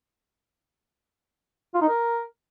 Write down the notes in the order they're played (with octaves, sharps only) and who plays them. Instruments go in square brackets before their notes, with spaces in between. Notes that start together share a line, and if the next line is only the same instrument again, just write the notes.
[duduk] F4
D#4
A#4